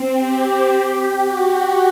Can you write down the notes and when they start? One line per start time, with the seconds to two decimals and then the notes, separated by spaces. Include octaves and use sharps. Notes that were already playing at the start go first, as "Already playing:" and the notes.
Already playing: C4
0.17 G4
0.69 G4
1.20 F#4